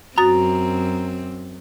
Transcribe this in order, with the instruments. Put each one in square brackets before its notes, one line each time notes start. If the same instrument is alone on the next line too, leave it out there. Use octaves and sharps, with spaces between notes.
[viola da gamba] F#2 C4 [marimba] F#4 D#6 A6 [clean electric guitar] A#5